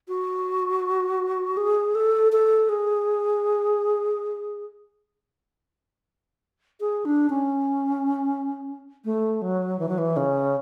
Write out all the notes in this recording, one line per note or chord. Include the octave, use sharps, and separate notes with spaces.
F#4
G#4
A4
A4
G#4
G#4
D4
C#4
A3
F#3
E3
F#3
E3
C#3